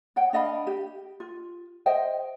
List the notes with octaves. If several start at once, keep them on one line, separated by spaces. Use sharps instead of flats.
C#5 F#5 G5
D4 D#5 F5 B5
G4
F4
C5 D#5 E5 G5